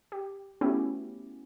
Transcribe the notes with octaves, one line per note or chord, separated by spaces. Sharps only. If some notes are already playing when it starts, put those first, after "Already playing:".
G4
A3 B3 C#4 E4 F#4 G4